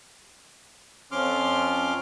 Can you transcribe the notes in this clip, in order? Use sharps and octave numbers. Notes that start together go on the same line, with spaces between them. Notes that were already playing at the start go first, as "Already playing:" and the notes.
F2 F3 C#4 C6 D6 F6